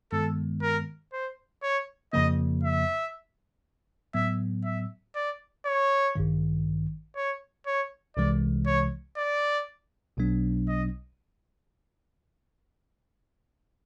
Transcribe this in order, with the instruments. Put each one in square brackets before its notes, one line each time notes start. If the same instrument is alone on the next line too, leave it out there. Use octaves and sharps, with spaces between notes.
[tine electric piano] G2 D#3 G#3 B3 [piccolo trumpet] A4
[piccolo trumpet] A#4
C5
C#5
[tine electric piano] F2 C#3 F3 A#3 [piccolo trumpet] D#5
[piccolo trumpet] E5
[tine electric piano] A2 F#3 B3 [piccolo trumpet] E5
[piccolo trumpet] E5
D5
C#5
[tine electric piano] A1 G2 D#3
[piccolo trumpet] C#5
C#5
[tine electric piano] C2 C3 E3 G#3 [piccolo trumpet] D5
[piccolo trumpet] C#5
D5
[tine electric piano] B1 B2 F#3 B3 D4
[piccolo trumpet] D#5